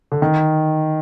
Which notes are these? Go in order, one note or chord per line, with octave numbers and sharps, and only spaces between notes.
D3
D#3